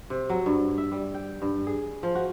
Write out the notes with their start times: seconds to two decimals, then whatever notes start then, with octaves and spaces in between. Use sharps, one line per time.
0.10 C3
0.29 F#3
0.46 G2
0.78 E5
0.91 G3
1.14 G5
1.42 G2
1.67 G#4
2.03 F3
2.15 F#4